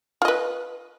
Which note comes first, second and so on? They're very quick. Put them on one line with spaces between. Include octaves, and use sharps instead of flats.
F4 D#5 B4